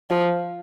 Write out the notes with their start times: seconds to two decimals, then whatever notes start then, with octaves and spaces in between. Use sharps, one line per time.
0.10 F3